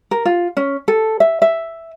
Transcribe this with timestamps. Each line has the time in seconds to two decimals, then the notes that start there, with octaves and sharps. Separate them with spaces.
0.11 A#4
0.25 F4
0.57 C#4
0.88 A4
1.20 E5
1.42 E5